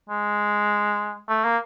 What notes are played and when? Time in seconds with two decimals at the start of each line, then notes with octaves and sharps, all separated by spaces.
0.09 G#3
1.29 A3
1.44 A#3